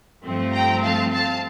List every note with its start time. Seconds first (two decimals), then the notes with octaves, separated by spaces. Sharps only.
0.25 G2 F3 A3 C4
0.53 G5 A#5
0.83 F5 A5
1.12 F5 A5